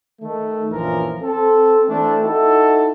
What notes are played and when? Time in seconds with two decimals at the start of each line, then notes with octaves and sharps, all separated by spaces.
0.21 D#3 A3
0.70 A#1 F#2 E3 F3 A#4
1.22 C4 A4
1.87 E3 A3 C4 D4
2.22 D#4 E4 F#4 A4